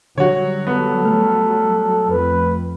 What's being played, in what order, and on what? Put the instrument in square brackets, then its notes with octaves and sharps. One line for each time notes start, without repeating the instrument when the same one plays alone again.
[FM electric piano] D3 [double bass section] F#3 G3 [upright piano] F#4 C#5
[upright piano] B3 [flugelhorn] A4
[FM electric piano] A3 F6
[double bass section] F2 [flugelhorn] B4